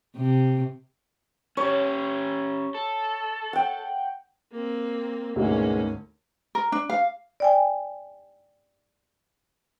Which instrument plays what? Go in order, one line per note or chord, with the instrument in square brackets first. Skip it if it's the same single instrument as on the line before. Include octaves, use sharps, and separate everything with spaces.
[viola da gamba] C3
[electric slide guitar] C#4 G4 [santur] C#5
[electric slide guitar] A4
[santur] F#5 G5
[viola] A#3 C4
[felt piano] D2 G#2 [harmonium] B2 G#3 [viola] A#3 C#4
[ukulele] A#4
D4
F5
[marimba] D5 G5 G#5